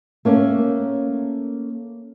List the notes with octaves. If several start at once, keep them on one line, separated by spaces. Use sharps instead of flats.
A3 A#3 C#4